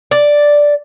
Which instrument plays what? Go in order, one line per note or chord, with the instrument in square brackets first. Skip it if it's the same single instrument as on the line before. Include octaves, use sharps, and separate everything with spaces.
[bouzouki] D5